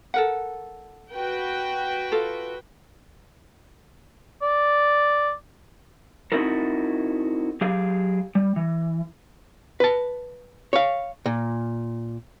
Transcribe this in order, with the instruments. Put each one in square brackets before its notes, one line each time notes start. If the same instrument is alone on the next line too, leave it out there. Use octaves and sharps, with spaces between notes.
[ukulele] A4 A#4 F#5
[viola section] F#4 B4 G5
[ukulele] F4 A4
[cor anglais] D5
[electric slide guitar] C4 D#4 E4 F#4 A4 A#4
F#3 G4 G#4 F5
G3
E3
[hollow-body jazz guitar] B4 A5
C#5 F5
A#2